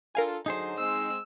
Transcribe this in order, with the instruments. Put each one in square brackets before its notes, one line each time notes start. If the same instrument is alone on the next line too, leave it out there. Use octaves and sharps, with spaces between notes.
[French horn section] D4 F4 A4 [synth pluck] A#4 F5 G#5
[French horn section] D3 F#3 [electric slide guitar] D#4 G#4 C5
[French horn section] G#3 C4 [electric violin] E6